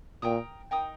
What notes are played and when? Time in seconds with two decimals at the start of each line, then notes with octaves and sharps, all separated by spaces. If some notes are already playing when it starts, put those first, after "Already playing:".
0.22 A#2 A#4 G5 A#5 D#6
0.71 D#4 A#4 G5 D#6